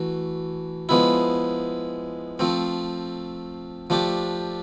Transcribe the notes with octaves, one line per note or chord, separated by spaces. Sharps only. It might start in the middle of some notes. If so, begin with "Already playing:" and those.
Already playing: E3 A3 F#4
F3 G#3 B3 E4
F3 A3 C4
F3 A3 D4 G4